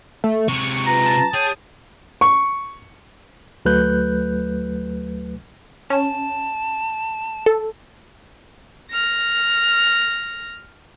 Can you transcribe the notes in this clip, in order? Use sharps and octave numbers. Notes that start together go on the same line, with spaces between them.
A3
C3 G#3 C#6
F4 B4 A#5
A5
G#4 C#5 G5 D#6
C#6
D2 F#3 A3 B4 F#6 G6
C#4 A5
A4
F6 A#6